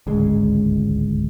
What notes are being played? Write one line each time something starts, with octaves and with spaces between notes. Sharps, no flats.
D1 G#1 C#2 G#3